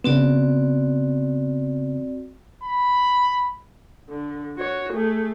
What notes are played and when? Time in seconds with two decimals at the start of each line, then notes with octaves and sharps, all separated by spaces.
0.04 C#3 B3 C4 F#4 D5
2.63 B5
4.10 D3
4.56 F#4 C#5
4.93 A3 G#4